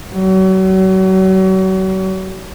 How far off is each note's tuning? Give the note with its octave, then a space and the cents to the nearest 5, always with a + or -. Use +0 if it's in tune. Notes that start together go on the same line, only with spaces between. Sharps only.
F#3 +35